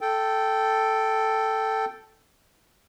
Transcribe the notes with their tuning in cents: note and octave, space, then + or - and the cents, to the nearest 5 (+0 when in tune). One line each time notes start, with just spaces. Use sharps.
A4 +0 G5 -5